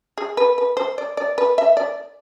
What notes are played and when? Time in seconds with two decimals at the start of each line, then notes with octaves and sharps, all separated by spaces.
0.18 G#4
0.37 B4
0.58 B4
0.77 C5
0.98 D5
1.17 D5
1.38 B4
1.58 E5
1.77 D5